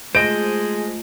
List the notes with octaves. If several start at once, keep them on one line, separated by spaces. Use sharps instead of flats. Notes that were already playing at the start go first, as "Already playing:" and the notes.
G#3 A3 F4 C5 D#5 D7